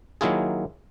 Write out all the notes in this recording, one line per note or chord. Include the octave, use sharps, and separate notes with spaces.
D#3 F#3 A#3 E4 F4 G#4